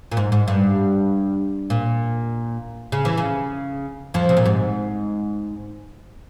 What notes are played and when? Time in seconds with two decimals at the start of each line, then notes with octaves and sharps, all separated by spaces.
0.12 A#2
0.17 G#2
0.32 G#2
0.48 G2
1.70 A#2
2.92 C#3
3.05 E3
3.18 C#3
4.14 F2 F3
4.29 C3
4.37 A#2
4.46 G#2